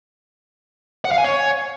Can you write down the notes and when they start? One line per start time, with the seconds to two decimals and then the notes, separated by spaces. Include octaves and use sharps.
1.05 F#5
1.12 F5
1.18 G#5
1.24 C#5